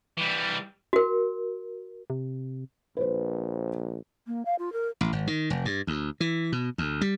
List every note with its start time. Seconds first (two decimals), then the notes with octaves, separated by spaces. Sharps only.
0.17 E3 G3
0.93 F#4 A#4
2.10 C3
2.97 A#1 B4 C5
4.27 A#3
4.45 F5
4.59 F4
4.73 A#4
5.01 A1
5.13 G#1
5.27 D#3
5.50 F1
5.65 G2
5.87 D2
6.20 E3
6.52 B2
6.78 D2
7.01 G3